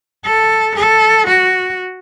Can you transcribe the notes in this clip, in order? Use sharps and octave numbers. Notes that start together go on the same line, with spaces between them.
A4
A4
F#4